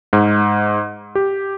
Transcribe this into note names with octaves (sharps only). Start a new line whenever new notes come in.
G#2
G4